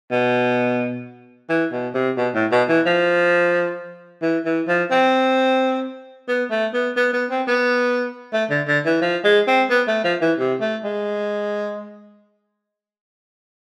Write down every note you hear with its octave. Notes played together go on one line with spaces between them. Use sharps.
B2
E3
B2
C3
B2
A2
B2
E3
F3
E3
E3
F3
C4
B3
A3
B3
B3
B3
C4
B3
A3
D3
D3
E3
F3
G#3
C4
B3
A3
F3
E3
C3
A3
G#3